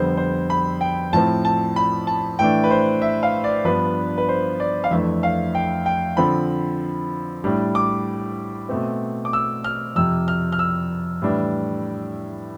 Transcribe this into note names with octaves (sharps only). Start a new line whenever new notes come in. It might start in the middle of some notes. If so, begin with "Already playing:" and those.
Already playing: F2 D3 G3 B3 C5
C5
B5
G5
A2 F3 C4 A5
A5
B5
A5
A2 E3 A3 D4 G5
B4
C5
E5
F5
D5
G2 F3 B3 D4 B4
B4
C5
D5
F5
F2 E3 A3 D4 E5
F5
G5
G5
D3 F3 C4 B5
A2 G3 D4
D6
B2 A3 C4
D6
E6
F6
F2 C3 F3 E6
F6
F6
E6
A2 E3 G3 D4